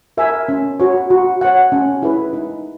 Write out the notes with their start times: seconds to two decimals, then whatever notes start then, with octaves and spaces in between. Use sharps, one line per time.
0.17 A#4 E5 G#5
0.48 C#4
0.79 F#4 C#5
1.10 F#4
1.41 C#5 F#5
1.72 C#4
2.02 E4 G#4 B4
2.33 D#4